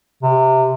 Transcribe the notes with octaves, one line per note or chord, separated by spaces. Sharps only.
C3